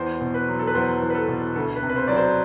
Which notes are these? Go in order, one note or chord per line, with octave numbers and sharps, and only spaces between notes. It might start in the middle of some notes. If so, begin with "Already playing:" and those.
Already playing: E2 C5
B2
B4
F#3
A4
B4
E2 C5
E2
B4
A4
B2
D2 A4
B4
C3
B4
C5
F#3 D5
C5